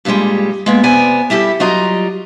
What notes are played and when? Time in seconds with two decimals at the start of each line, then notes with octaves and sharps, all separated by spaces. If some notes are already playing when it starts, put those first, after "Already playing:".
0.05 G2 A#2 E3 G3 G#3
0.66 G#3 A#3 B3
0.83 C3 B3 D5 G#5
1.30 G3 E4 G4 A4
1.60 F#3 G3 F4 D#5 A#5